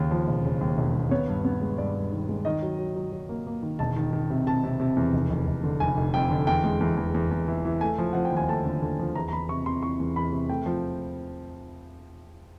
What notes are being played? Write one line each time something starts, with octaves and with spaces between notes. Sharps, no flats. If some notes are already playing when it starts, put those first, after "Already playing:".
Already playing: D#2 C#3
F3
E1
C#3
D#2
E1
D#2
B3 C#5
G2
B3
G#3
G2 D5
G2
D#3
G#3
D#3 D#5
F#3
F#3
F#3
F#3
A#3
A#3
D#3
E1 A5
D#3
D#3
C3
C3 A5
C3
C3
E2
F1
F1
F1
D3
F1 G#5
F1
F2 G5
D3
E2 G5
G#3
E2
E2
E2
E2
E3
E3
A3 G#5
F3
F3 F#5
G5
D#2 G#5
A3 A5
D3
D3
F3
E2 A#5
A#5
E2 B5
C3 C#6
C3 C6
E3 C#6
E2
E2 B5
C3
A3 G5
F3